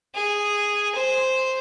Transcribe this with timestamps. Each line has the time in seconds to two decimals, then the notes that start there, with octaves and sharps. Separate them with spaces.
0.15 G#4
0.95 C5